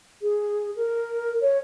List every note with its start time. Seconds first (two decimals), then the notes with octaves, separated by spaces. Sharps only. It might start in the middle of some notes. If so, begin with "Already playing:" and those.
0.22 G#4
0.76 A#4
1.41 C#5